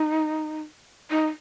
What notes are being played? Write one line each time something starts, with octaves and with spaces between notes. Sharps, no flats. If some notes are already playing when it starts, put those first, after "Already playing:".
Already playing: D#4
D#4